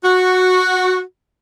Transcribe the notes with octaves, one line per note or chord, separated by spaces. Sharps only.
F#4